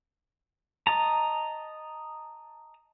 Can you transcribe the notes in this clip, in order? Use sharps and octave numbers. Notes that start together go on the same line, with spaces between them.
D#5 A5 A#5